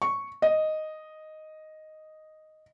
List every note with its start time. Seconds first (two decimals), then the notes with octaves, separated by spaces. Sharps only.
0.02 C#6
0.42 D#5